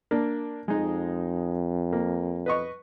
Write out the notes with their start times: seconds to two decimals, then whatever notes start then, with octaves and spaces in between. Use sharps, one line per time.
0.11 A#3 D4
0.68 F2 G#3 D#4
1.93 A#3
2.46 B4 D#5 C#6